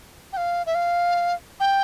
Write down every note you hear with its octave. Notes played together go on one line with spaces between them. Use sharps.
G5
F5
E5
F5
G5